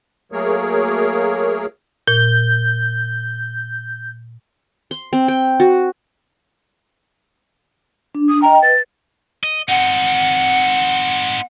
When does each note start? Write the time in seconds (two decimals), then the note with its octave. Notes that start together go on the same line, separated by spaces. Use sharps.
0.32 F#3 A3 A#3 G#4 A#4 C#5
2.07 A#2 G6
4.91 C6
5.13 C4
5.28 G5
5.60 F#4
8.15 D4
8.29 D#6
8.42 D#5 G5 A#5
8.63 B4 A6
9.44 D#5
9.69 C4 D#4 F#5